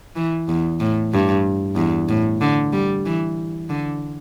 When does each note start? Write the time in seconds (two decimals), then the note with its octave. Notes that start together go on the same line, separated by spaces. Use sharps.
0.16 E3
0.49 E2
0.80 A2
1.13 G2
1.76 E2
2.09 A2
2.41 D3
2.73 G3
3.06 E3
3.69 D3